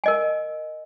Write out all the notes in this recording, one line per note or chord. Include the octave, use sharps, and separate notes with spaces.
A#4 D#5 G#5